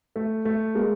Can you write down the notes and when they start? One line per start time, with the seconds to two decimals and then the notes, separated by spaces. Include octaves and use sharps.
0.16 A3
0.45 A3
0.75 G#3 A#3